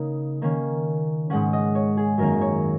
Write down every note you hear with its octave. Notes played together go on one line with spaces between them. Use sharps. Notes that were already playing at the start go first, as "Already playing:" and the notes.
Already playing: C#3 A#3 D#4
D#3 A#3 C#4
G#2 G#3 C#4 F#5
D#5
C#5
G#4
F#2 D#3 A#3 C#4 A#4
C#5